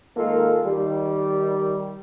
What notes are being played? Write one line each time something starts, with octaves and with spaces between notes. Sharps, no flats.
D#3 G#3 A#3 F4 A4 A#4
D#3 G3